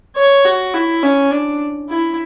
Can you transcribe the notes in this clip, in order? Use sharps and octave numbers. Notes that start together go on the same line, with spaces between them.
C#5
F#4
E4
C#4
D4
E4